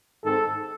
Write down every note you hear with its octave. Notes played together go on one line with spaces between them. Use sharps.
G#2 D#3 G#3 C4 A4